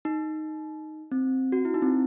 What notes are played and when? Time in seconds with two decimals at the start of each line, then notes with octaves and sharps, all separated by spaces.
0.05 D#4
1.12 C4
1.52 F#4
1.65 E4
1.74 D#4
1.82 C4